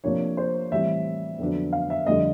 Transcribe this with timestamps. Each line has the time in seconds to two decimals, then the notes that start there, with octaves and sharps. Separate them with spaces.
0.04 C3 F3 A#3 D4 C#5
0.37 C5
0.71 A2 E3 G3 C4 E5
1.39 F2 D3 F#3 B3 D4
1.73 F5
1.90 E5
2.06 F2 D3 G3 C4 D#5